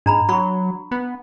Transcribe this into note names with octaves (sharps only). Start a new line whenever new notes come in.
G#2 D4 A#5 B5
F#3 B5 C#6
B3